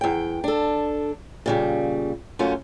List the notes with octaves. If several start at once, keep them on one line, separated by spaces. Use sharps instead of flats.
E2 G5
D4 A4
A#2 C#3 G3
F#2 A3 C#4 F4